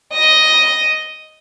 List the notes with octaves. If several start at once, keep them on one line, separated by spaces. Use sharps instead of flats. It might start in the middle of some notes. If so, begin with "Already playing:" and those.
D#5